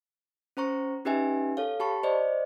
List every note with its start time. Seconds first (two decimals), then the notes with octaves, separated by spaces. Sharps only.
0.57 C#4 C5 A#5 C#6
1.05 C#4 D#4 G4 B4 E5 G#5
1.57 A4 C#5 F5
1.80 G4 A5 B5 C#6
2.03 C5 D5 D#5